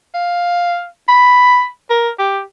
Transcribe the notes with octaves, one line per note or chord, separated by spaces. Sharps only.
F5
B5
A#4
G4